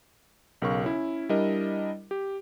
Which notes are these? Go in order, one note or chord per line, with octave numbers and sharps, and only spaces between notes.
B1 C#3 A#4 F5 C#6
C#4 E4
G3 D4 E4 A#4 D5 D#5
G4